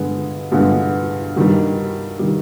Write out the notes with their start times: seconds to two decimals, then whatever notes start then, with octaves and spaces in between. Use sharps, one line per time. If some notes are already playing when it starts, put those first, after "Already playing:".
Already playing: G2 D3 G#3 B3
0.52 G2 D3 G#3 B3
1.36 G2 D#3 G3
2.19 D#3 G3